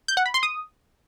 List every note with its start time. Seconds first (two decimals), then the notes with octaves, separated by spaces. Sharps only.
0.08 G6
0.17 F#5
0.26 B5
0.34 C6
0.43 D#6